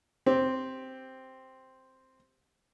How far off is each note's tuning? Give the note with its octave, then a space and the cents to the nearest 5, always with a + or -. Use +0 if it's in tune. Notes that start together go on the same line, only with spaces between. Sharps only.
C4 +0 G4 +0